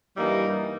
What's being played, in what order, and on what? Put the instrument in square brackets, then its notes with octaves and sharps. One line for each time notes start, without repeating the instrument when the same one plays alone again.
[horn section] G2 E3 G3 A#3 D#4